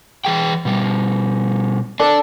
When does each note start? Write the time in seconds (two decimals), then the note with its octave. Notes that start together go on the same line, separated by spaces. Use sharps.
0.25 E3 G#4 G5
0.65 B2 G3
2.00 D4 A4 D5